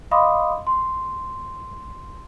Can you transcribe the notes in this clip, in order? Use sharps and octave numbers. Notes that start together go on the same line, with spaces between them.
D#5 F5 B5 C6 D6 D#6
C6